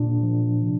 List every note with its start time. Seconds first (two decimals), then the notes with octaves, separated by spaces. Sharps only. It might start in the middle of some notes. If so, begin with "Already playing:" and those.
Already playing: A#2 D4
0.23 F3
0.63 C3